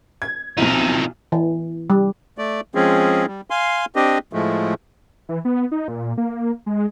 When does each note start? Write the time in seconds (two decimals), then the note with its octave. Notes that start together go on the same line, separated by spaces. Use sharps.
0.22 G#6
0.58 B1 F3 C4 D#4 E4
1.32 E3
1.90 G3
2.38 A3 D5
2.75 F3 G#3 C4 C#4 G#4
3.27 G3
3.50 F5 G#5 C6
3.96 C4 D4 G4 D#5
4.33 A2 F3 G#3 A3
5.29 E3
5.45 B3
5.72 D#4
5.88 A#2
6.18 A#3
6.66 G#3